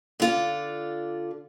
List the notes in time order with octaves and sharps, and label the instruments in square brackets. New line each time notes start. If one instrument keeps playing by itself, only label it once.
[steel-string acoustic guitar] D3 F4 D5